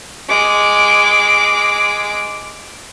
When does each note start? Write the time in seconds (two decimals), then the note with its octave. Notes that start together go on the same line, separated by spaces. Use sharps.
0.29 G#3 D6